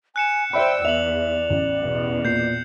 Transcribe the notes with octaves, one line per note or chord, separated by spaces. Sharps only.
G#5 F#6 C#7 E7
C5 D5 E5 G5 B5 E6
E2 E5 F7 F#7
A1
E2 B2
A#2 G6 C7